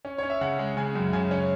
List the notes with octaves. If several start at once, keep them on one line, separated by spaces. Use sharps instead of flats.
C#4
C#4 C#5
E5
C#3 F#5
G#3
C#3 G#5
F#2
C#3 G#5
C#4